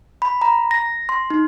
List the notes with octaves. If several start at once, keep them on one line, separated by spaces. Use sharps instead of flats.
B5
A#5
A#6
C6
D#4